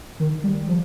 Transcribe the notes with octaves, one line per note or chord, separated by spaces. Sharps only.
D#3
G3
F3